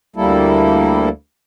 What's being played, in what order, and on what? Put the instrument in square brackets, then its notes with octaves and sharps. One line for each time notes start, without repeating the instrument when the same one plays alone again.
[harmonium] D2 G3 A#3 E4 A4